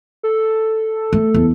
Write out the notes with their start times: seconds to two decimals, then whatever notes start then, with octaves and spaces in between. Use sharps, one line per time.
0.23 A4
1.13 A3
1.34 E2